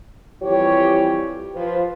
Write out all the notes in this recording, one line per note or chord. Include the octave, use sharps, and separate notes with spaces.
F2 E3 G3 G4 C#5
F3 B4